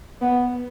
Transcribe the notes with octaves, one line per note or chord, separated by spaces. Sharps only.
B3